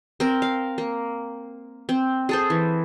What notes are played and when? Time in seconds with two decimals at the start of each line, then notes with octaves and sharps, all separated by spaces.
0.20 C4 A#4
0.42 F5
0.78 A#3
1.89 C4
2.29 G#4 A4 C5
2.50 E3